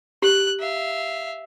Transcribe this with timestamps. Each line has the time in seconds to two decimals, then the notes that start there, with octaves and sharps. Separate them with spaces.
0.22 G4 F#6
0.60 E5 F5